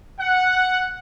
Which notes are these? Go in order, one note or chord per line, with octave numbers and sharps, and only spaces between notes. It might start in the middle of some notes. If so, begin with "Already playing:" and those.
F#5